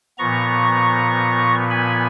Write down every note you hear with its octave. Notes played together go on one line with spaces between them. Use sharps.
A#2 F3 B3 A#5 C#6
G#5 B5